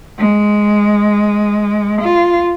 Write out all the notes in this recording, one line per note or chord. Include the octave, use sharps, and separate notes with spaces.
G#3
F4